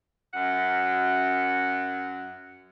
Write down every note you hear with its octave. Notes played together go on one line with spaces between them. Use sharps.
F#2 F#5